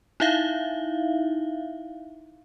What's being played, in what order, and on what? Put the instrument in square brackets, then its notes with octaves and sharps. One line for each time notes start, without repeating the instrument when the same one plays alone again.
[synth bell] D#4 E4 E5 F5